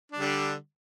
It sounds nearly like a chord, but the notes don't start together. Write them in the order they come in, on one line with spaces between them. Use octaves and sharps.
D4 G3 D3